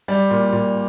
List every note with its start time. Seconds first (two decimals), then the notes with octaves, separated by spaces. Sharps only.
0.08 G3 D5
0.31 A#2
0.52 A#2